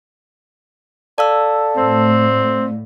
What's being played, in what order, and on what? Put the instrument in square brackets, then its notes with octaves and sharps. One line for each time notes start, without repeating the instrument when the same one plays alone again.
[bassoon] A4 [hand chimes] D5 F5 E6
[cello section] A2 [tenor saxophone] C4